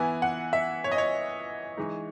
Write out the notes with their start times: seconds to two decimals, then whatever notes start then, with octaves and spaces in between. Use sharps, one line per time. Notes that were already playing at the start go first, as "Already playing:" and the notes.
Already playing: E3 B3 E4 G#5
0.22 F#5
0.53 E5
0.84 C#5
0.92 D#5
0.98 C#5
1.77 E3 G#3 D#4